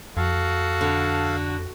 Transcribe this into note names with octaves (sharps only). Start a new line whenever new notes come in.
F2 F#4 A4 F5
D3